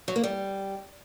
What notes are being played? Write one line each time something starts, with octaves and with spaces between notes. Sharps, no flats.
F#3
A#3
G3